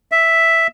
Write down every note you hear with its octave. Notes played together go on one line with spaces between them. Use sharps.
E5